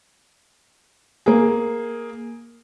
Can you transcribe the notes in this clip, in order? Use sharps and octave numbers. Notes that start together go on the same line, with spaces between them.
A#3 G#4